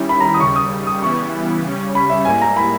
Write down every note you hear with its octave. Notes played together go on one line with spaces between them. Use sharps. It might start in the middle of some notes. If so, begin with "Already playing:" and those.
Already playing: D#3 G3 C#4 E4
B5
A#5
B5
D#6
D#2 C#3 G3 C#6
D#6
D#6
C#3 E3 G3 B3 E4 C#6
C#3 G3 C#4
B5
E5
G#2 G3 A#3 E4 G#5
A#5
B5